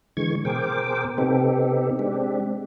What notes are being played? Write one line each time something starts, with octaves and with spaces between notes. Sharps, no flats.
D3 E3 G#3 C#6 G#6
B2 G#4 A#4 C5 G5 D6
C3 B3 C4 D#4 G4 A4
G#3 C4 D4 G4